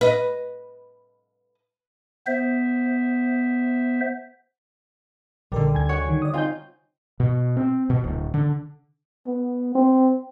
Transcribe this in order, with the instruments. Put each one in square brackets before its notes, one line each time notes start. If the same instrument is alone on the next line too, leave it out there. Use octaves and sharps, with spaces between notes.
[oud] B4 D#5
[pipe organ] B3 C5 E5
[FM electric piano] A#1 A#4 [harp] D3 G3
[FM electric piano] D2 G#5 G#6
[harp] F#4 C#5 F#5
[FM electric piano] D#3
D5 D#6
[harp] C4 D#4 F4 [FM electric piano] F5 G#5 G6
[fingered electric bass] B2
C4
B2
D1
D3
[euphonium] B3
C4